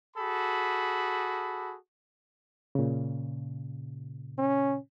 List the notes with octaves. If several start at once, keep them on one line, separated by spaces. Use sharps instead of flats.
F#4 G#4 A4 B5
A#2 C#3
C#4